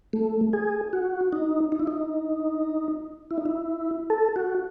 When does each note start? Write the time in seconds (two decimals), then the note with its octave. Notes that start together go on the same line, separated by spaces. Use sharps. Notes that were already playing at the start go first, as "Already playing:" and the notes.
0.13 A3
0.53 G#4
0.93 F#4
1.32 D#4
1.72 D#4
1.80 E4
1.87 D#4
3.31 E4
3.38 D#4
3.45 E4
4.10 A4
4.36 F#4